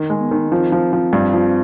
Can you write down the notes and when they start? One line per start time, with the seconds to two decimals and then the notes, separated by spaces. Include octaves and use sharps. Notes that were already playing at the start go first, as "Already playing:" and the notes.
Already playing: D#3
0.10 G#3
0.20 B3
0.31 D#3
0.52 F3 C4
0.72 F3
0.93 F3
1.13 G2
1.33 F3